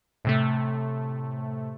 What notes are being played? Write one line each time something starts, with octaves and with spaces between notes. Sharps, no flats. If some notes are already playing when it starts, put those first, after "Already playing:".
A2 C3 A3